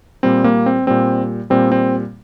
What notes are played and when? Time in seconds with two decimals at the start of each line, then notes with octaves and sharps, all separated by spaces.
0.23 A#2 G3 C4
0.44 A#3
0.66 C4
0.87 A#2 G3 C4
1.50 A#2 G3 C4
1.72 C4